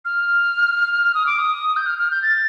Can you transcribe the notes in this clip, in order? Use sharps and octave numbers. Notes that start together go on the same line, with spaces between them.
F6
D#6
D6
D#6
G6
F6
F6
G6
A6